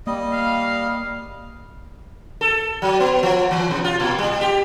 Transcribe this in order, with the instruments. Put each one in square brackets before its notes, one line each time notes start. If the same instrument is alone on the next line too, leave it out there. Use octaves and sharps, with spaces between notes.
[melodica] G3 D#5 [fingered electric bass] A#3
[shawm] F5
[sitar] A4
F#3
B3
F3
E3
B2
F4
A#2
G3
G4